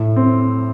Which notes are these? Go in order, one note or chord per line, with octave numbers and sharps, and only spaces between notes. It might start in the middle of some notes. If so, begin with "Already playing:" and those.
Already playing: A2
C4